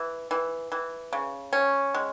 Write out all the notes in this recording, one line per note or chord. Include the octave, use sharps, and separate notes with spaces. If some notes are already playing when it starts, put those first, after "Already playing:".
Already playing: E3
E3
E3
C#3
C#4
G#3